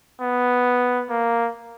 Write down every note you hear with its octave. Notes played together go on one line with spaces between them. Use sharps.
B3
A#3